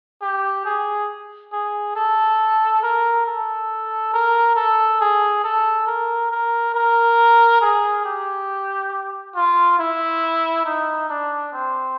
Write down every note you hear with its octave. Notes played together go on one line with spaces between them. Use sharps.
G4
G#4
G#4
A4
A#4
A4
A#4
A4
G#4
A4
A#4
A#4
A#4
G#4
G4
F4
E4
D#4
D4
C4